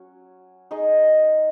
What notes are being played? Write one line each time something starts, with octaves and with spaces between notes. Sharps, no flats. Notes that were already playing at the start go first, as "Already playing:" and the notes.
Already playing: F#3 C#4
D#4 G#4 D#5